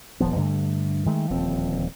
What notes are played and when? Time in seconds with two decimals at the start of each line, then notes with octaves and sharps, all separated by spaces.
0.20 D#1 F3 B3
0.36 G2 D3 A3
1.06 D#3 G#3 A3
1.30 D#1 D2 F3 C4